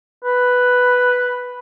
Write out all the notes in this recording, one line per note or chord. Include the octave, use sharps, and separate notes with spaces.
B4